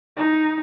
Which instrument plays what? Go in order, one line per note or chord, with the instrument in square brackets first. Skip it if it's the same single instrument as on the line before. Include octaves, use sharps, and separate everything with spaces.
[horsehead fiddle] D#4